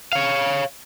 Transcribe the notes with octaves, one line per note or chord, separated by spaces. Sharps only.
C#5 F5